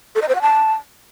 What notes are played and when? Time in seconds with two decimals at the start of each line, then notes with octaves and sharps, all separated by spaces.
0.15 A4
0.22 D#5
0.28 C5
0.35 F#5
0.42 A5